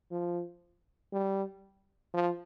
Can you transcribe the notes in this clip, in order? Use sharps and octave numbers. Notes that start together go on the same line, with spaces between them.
F3
G3
F3